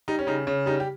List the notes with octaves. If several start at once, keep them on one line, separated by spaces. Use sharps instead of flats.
G3 D#4
C#4
C#3 D#4
C#3
G3 D#4
G4